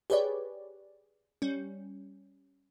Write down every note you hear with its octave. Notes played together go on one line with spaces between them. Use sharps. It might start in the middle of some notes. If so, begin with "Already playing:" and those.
G4 G#4 B4 C#5 D5
G3 C#4